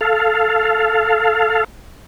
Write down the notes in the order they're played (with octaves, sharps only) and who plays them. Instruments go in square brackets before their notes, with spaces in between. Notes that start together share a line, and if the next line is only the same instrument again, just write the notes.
[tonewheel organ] A4 F5